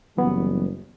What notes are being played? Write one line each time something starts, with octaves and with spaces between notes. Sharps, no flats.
F#1 E3 F#3 G3 B3